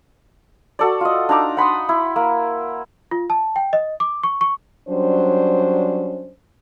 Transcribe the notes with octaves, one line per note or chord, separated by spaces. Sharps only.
F#4 A4 D5
F4 D#5
D4 D#4 A#5 D6
F#5 B5 C6 D#6
E4
A#3
F4
A5
G5
D#5
D6
C#6
C#6
F#3 G3 C#4 D4 C5